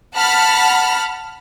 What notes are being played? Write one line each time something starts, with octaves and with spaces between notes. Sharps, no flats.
F#5 A5 B5 F6